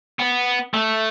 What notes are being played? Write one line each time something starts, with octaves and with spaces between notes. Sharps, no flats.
B3
A3